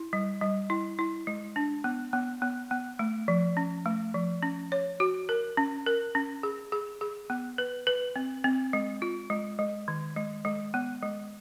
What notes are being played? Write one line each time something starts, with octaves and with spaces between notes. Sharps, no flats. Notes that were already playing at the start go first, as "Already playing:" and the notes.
Already playing: E4
G3
G3
E4
E4
G#3
D4
B3
B3
B3
B3
A3
F3
C#4
A3
F3
C#4
C#5
F#4
A#4
C#4
A#4
C#4
G#4
G#4
G#4
B3
B4
B4
C4
C4
G#3
F4
G#3
G#3
D#3
G#3
G#3
B3
G#3